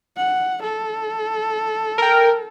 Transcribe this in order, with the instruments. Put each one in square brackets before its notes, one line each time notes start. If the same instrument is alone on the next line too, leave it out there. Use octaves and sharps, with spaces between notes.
[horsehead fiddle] F#5
A4
[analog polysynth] A#4 G5